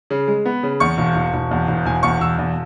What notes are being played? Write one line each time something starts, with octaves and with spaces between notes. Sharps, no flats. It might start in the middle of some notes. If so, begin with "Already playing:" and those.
C#3
G#3
B3
C#3
E2 C#6
E1
E1
E1
E2
E1
E1 G#5
E2 C#6
E1 E6
E2